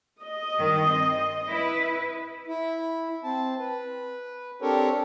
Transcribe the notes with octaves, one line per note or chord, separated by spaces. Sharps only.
D#5
G2 D#3
C4
E4 B4
E4
C4 A5
B4
C4 D4 G4 A4 A#4 C#5